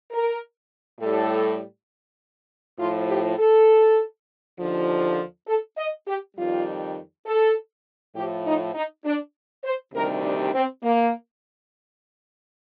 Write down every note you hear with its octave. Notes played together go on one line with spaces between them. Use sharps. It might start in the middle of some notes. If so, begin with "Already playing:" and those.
A#4
A2 G3 A4
A2 F3 F4
G4
A4
D#2 D3 F3
A4
D#5
G4
F2 D#3 G3 F4
A4
A2 F3 G4
D#4
D#4
D4
C5
D2 C3 D#3 G3 A#4
D4
C4
A#3